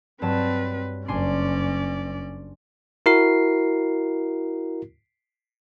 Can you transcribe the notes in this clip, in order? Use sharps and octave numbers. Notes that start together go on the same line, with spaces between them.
G2 F#3 C4 B4 A5
F#1 C#4 D4 D5 G#5 C6
E4 F#4 A#4 C7